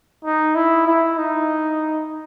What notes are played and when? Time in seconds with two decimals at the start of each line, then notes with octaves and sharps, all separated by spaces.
0.25 D#4
0.55 E4
0.87 E4
1.18 D#4